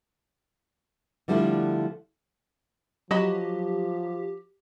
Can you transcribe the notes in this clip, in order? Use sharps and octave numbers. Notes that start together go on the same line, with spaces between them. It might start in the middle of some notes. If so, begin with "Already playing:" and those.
D3 F3 G3 A3 D4 E4
F3 F#3 F#4 G4 D#5 B5